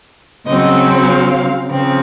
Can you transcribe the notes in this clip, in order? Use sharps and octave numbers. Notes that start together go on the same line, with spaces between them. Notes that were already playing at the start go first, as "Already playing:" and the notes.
C#3 F#3 C4 D#5
F5
C#3 F3 C4